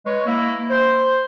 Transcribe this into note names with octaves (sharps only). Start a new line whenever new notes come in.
G#3 B4 C#5
A#3 E4
C5